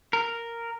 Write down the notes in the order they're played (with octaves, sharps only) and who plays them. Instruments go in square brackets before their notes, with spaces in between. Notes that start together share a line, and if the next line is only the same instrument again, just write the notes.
[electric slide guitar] A#4